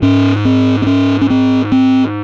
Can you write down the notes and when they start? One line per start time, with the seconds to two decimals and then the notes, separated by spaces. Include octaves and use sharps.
0.02 G#2 C#4
0.45 C4
0.82 C4
0.86 C#4
1.21 C#4
1.30 C4
1.72 C4